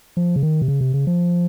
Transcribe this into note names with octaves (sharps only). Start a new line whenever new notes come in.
F3
C#3
D#3
C3
C#3
C3
C#3
F3